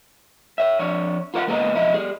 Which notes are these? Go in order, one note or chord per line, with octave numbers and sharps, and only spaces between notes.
C#5 E5
F2 D4 C#5
F4 A#4 D5 F#5
C#2 A#3 B3 G#4 D#5 A#5
B1 F2 E4 D#5
G3 G#4